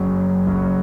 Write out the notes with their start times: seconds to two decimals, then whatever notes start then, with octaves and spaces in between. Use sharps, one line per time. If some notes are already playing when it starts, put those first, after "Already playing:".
Already playing: F#1 F#2 F#3 C#4
0.47 F#1 F#2 F#3 C#4